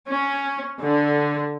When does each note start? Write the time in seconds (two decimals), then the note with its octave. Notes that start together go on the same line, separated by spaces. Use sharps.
0.11 C#4
0.81 D3